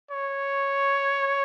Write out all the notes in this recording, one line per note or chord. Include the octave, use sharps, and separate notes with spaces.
C#5